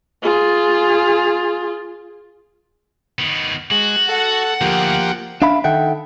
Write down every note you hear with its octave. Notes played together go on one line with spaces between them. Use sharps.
F4 G#4
D#3 B3
G#3 F#4
A4 F#5
D2 F3 A#3 G4
D4 E5 F5 B5
D#3 A4 E5 F#5 G5